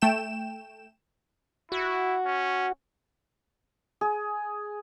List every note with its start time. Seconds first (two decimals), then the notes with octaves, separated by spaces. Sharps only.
0.02 A3 G5 E7
1.72 E4 F#4
2.25 C#4
4.01 G#4